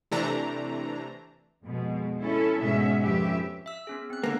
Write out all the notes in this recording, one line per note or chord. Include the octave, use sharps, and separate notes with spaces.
C3 E3 A3 D4 A#5
F2 B2 G#3
C#4 E4 A4
G#2 B2 G#3 B3 C#4 E5
F2 F3 C#4 G4 B4 E5
E5 E6
B3 C#4 G#4
C4 F#6
D3 A#3